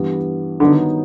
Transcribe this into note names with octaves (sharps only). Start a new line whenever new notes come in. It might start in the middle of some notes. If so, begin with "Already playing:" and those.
Already playing: G2 E3 G3 B3
G2 D3 D#3 F#3 B3 D#4